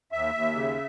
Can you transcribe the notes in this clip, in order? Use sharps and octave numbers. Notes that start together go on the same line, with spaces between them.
D#2 E5
D#2
C#3